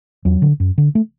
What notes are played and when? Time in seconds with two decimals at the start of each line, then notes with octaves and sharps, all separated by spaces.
0.25 E2 F#3
0.42 D3
0.60 F#2
0.78 D3
0.95 A3